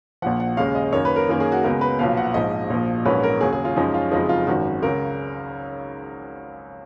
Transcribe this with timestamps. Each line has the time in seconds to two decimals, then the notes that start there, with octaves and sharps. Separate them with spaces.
0.22 A#1 A#2 F3 F#5
0.40 F#5
0.57 D#2 C#3 G#3 F5
0.75 D#5
0.92 F#2 D#3 A#3 C#5
1.05 B4
1.16 A#4
1.29 F#2 D#3 A#3 C#4 A#4
1.40 G#4
1.52 F#4
1.64 C#2 C#3 G#3 B3 A#4
1.81 B4
1.99 B1 A#2 F3 B3 F5
2.17 F#5
2.34 A#1 G#2 F3 D#5
2.70 A#1 A#2 F3
3.05 A#1 G#2 F#3 A#3 C#4 B4
3.23 A#4
3.41 D#2 C#3 F#3 G#4
3.53 G#4
3.65 F4
3.76 F#2 F3 G#3 C#4 D#4
3.94 F4
4.11 F#1 F2 F3 G#3 D#4
4.29 F4
4.47 G#1 F#2 D#3 F#4
4.82 C#2 C#3 F#3 A#4